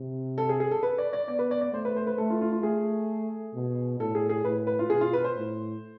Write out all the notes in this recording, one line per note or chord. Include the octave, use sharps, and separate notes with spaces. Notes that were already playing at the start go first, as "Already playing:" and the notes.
Already playing: C3
A4
G#4
G#4
A4
B4
D5
D5
B3 D5
B4
D5
D5
A3 C5
B4
C5
B4
A3 A4
F4
F4
F4
A3 G#4
B2
A2 A4
G#4
G#4
A2 B4
B4
F4
B2 G#4
F4
B4
C5
A2